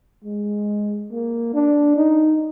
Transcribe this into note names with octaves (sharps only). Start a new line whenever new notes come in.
G#3
A#3
D4
D#4